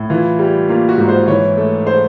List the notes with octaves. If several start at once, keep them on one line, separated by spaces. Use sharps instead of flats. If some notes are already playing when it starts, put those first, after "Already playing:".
Already playing: A2
E3 F4
G3
A#3 F4
F#4
G#2
C5
E3 C#5
A3
C5